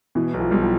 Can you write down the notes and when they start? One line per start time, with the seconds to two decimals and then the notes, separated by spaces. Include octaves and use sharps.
0.15 B2 E3
0.34 B1
0.40 F3
0.51 B1 G3
0.62 F3